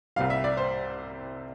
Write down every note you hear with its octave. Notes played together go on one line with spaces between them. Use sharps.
C2 C3 G3 F5
E5
D5
C5